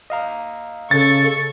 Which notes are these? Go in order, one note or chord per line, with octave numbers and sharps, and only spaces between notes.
D#5 F5 A#5
C#3 A4 C#6 A6